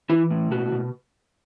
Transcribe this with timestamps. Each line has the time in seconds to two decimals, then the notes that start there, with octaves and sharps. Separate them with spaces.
0.10 E3 E4
0.30 A2
0.51 B2 F#4
0.72 B2